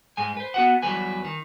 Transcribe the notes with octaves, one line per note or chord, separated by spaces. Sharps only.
G#2 G#3 G#5
B4 C5
B3 F#4 F#5
E2 G#2 F#3 G3 B4 G#5
D#3